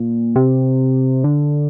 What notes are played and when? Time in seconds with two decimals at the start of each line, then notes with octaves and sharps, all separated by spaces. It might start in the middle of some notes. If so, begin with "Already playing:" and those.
Already playing: A#2
0.36 C3
1.24 D3